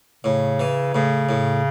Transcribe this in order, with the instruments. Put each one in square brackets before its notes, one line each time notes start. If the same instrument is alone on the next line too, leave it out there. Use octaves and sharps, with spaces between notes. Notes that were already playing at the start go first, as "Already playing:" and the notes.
[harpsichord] A2 [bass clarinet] C#3
[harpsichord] E3
[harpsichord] A2 [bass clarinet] C#3
[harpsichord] A2